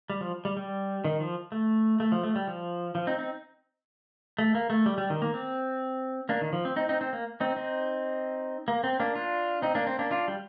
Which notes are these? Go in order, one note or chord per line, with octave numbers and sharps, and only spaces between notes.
G3
F3
G3
G3
D#3
F3
A3
A3
F3
A3
G3
F3
F3
C4 D#4
C4 D#4
A3
A#3
A3
G3
G3
D#3
A#3
C4
A#3 D4
D#3
F3
C4
C4 D#4
C4 D#4
C4
A#3
C4 D#4
C4 D#4
A#3
C4
A#3 D4
D4 F4
C4 D#4
A#3 D4
C4
A#3 D4
D4 F4
G3